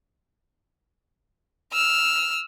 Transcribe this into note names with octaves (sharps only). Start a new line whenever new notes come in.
E6 F6